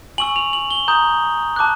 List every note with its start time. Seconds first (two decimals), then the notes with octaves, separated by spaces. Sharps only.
0.18 G#5 C#6 E6 F#7
0.36 F7
0.53 F#7
0.71 G7
0.88 A#5 D#6 G6
1.56 A5 D6 F#6